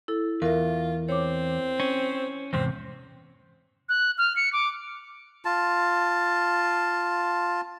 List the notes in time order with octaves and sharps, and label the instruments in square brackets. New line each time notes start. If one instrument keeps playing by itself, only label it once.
[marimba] E4 A4
[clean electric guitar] E2 [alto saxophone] F4 [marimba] A#4 E5
[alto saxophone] C4 [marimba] C#5 D6
[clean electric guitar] C#4
[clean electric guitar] E2 G#2 C3 [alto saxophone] C4
[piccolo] F#6
F6
C#7
D6
[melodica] F4 A5